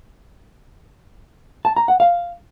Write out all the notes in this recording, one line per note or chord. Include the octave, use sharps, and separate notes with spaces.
A5
A#5
F#5
F5